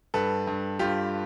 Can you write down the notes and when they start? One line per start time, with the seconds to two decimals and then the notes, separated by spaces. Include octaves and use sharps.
0.14 G2 A4 B4
0.47 G2
0.79 G2 F4 G4